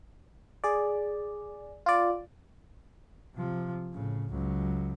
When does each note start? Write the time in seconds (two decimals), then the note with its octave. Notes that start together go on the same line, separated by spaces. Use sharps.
0.64 G#4 D5
1.86 F4 D5
3.35 C3 F3
3.93 A2 C#3
4.31 C#2 F#3